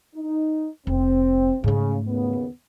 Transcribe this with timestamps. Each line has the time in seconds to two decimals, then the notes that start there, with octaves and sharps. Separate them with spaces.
0.16 D#4
0.87 F1 C4
1.64 G#2 C#3 A3
2.07 D#2 C#3 B3